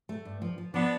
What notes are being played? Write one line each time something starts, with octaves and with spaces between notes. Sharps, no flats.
A3
G2
F3
F3
F3 B3 D4